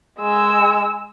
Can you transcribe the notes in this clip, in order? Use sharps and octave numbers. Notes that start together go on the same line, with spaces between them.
G#3 E6